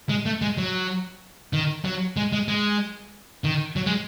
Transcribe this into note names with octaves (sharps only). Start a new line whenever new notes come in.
G#3
A3
G#3
F#3
D#3
F#3
G#3
G#3
G#3
D#3
F#3
G#3